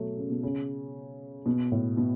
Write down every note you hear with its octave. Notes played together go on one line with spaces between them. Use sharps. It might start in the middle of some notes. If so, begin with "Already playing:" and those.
Already playing: B2 F#3 A3
C#3
B2
C#3
B2
A2
B2